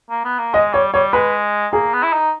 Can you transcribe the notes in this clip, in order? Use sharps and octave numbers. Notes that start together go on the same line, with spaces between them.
A#3
B3
A#3
G#3 D#5
G3 C#5
G3 C#5
G#3 B4
A#3 G#4
B3
E4
D#4